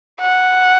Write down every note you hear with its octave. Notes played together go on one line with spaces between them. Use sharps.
F#5